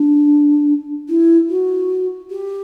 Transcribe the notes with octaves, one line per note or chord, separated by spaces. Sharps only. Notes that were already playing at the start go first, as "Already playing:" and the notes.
Already playing: D4
E4
F#4
G4